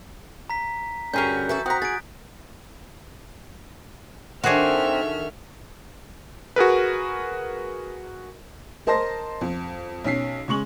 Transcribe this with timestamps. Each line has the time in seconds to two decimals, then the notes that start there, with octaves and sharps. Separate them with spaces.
0.50 A#5 B6
1.14 G2 D3 C#4 F#4 G#4 A#4 G6
1.49 E3 F#4 A4
1.66 C4 F#4 A#5 D#6 F#6 B6
1.82 G#4 A6 D7
4.44 D#3 C4 D4 F#4 G#4 A4 E5 F6
6.56 F#4 G#4 A#4 B4
8.87 A#4 C5 D#5 A5 C6 A#6
9.41 F2
10.04 B1 C#4 B6 C7
10.48 C#3 G#3 C#6 F#7